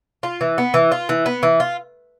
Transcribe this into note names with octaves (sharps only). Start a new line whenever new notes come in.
F4
E3
B3
E3
F4
E3
B3
E3
F4